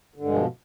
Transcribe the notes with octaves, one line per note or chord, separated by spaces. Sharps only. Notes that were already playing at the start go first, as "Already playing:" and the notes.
G2 B2 D3 F3 G#3